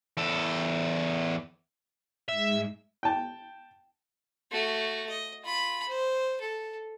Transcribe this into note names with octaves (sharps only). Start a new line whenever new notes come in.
E2 A4
G#2 G#3 E5
G5 A5
A3 F#4
D#5
F4 B5
C5
A4